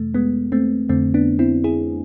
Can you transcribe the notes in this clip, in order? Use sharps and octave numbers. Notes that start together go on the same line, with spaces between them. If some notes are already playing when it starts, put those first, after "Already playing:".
Already playing: F2 C3 E3 A3
G#3 B3
A3 C4
F2 D3 A3 C4
B3 D4
C4 E4
E4 G#4